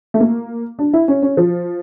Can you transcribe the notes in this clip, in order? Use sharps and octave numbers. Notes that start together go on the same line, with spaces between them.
A3
A#3
D4
E4
C#4
C#4
F3